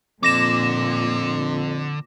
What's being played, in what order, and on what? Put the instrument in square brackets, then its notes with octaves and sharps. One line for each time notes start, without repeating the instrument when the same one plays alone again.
[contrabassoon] F2 [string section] A#2 [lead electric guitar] D3 [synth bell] D6 A#6 E7